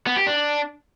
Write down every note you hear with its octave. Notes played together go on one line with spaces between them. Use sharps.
B3
G4
D4